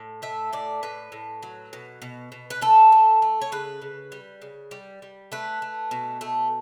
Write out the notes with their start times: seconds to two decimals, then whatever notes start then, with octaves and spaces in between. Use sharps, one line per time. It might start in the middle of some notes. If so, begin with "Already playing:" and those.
Already playing: A2
0.22 A3 E5
0.53 A2 D5
0.83 A2 B4
1.12 A2
1.43 F#3
1.73 B2
2.02 B2
2.32 B2
2.50 B4
2.61 A3 A4
2.92 A3
3.22 A3
3.41 C#5
3.52 C#3 B4
3.82 C#3
4.12 G3
4.42 C#3
4.71 G3
5.02 G3
5.32 A3 B4
5.62 A3
5.91 B2
6.21 A3